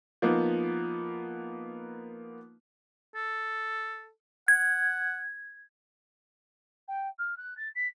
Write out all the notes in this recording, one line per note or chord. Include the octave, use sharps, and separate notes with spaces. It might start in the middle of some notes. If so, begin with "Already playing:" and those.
F3 A#3 B3 D#4
A4
F#5 G#6
G5
F6
F#6
A6
B6